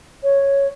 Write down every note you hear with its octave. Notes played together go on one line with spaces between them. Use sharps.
C#5